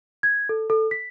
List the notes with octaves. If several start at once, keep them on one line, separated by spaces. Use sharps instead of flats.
G#6
A4
A4
B6